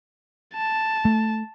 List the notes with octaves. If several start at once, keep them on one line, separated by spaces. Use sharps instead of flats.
A5
A3